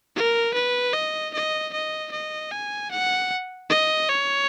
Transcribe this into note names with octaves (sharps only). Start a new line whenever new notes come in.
A#4
B4
D#5
D#5
D#5
D#5
G#5
F#5
D#5
C#5